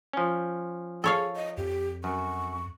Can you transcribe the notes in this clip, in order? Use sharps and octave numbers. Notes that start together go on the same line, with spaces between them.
F3 C#4
G#4 A4 C#5 F5
D#5
F2 G4
F#2 C#6